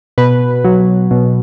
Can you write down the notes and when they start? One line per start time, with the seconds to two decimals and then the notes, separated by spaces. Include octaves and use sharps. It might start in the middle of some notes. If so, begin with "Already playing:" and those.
0.18 B2 B4
0.64 F#3
1.11 B2